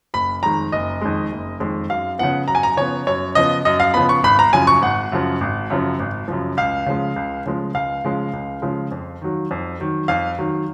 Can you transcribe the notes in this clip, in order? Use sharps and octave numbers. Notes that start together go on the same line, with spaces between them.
F#1 B5
F2 D#3 G#3 A#5
F#1 D#5
F2 D#3 G#3
F#1
F2 D#3 G#3
F#2 F5
C#3 F3 B3 F#5
F#2 A#5
G#5
A#5
C#3 F3 B3 C#5
F#2 C#5
C#3 F3 B3 D#5
F#2 D#5
F5
C#3 F3 B3 B5
C#6
G#1 B5
A#5
F#2 C#3 F3 G#5
C#6
G#1 F#5
F#2 C#3 F3
G#1
F#2 C#3 F3
G#1
F#2 C#3 F3
C#2 F5
C#3 F3 G#3
C#2
C#3 F3 G#3
C#2 F5
C#3 F3 G#3
C#2
C#3 F3 G#3
F2
D#3 F#3
F2
D#3 F#3
F2 F5
D#3 F#3